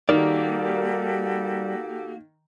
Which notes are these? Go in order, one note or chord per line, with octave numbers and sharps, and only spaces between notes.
D#3 G3 A#3 F#4 G4 A4 A#4 D5